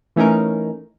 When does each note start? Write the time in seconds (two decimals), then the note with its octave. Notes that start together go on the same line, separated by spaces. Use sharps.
0.16 E3 A3 C#4 D#4 A#4